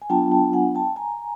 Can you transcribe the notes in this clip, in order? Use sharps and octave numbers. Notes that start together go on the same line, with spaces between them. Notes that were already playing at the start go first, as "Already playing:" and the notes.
G#5
F#3 B3 D4 F4 G5 A5
G5 A5
F#5 G#5
G5 A5
G#5 A#5